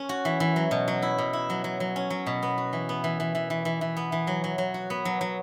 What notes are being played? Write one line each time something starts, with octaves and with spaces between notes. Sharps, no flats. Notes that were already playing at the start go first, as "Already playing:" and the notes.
Already playing: C#4
F#4
E3
E3
F#3
B2
F#3
E4
B2
E4
F#3
F#3
F#3
C#4
F#3
B2
B3
F#4
E3
B3
E3
E3
E3
E3
E3
E3
B3
E3
F#3
F#3
F#3
F#4
B3
F#3
F#3